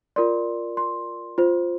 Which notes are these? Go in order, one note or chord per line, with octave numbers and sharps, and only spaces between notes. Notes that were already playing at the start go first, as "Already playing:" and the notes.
F4 A#4 D5 C6
C6
F4 C5